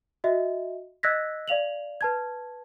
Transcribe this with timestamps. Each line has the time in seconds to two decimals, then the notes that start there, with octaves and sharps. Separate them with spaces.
0.24 F#4 D#5 E5
1.03 D#5 E6 F#6 G#6 A#6 B6
1.48 D5 F5 F7 F#7
2.01 B4 A5 G#6